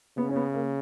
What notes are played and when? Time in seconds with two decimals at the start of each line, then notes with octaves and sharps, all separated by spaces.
0.17 C#3 B3
0.29 C#4
0.36 B3
0.54 A#3